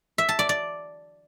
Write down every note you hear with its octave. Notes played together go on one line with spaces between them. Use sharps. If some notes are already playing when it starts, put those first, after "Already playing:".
E5
A5
D5
D5